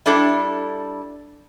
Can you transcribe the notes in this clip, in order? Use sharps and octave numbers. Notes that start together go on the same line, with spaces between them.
G3 D4 E4 A4